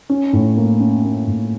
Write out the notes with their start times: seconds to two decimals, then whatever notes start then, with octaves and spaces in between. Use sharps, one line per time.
0.10 C#4
0.33 A2
0.57 A#3
0.80 C#4
1.04 A#3
1.27 A2